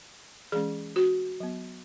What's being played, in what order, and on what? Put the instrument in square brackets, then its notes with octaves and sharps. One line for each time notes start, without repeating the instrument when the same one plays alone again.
[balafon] E3 G#3 C#4 G#4
F#4
F#3 B3